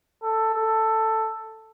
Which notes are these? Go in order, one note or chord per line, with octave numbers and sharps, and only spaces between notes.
A4
A4